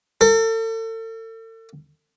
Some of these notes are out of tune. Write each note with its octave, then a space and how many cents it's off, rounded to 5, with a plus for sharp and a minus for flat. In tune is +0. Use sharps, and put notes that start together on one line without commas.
A4 +40